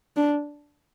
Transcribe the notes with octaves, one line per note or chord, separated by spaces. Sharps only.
D4